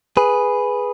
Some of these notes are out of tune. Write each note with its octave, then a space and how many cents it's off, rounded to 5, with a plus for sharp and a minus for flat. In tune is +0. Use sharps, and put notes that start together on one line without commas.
G#4 +0 B4 +0